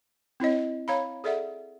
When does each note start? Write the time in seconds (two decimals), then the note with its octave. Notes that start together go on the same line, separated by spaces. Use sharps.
0.40 C4 E4 C#5 D#5
0.88 C#5 F5 A#5 B5
1.24 G#4 A4 D5 E5 F#5